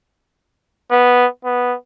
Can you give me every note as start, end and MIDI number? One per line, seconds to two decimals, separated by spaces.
0.91 1.27 59
1.45 1.75 59